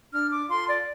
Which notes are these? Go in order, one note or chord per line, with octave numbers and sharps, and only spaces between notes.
D4 F6
D6
F4 A4 C6
D5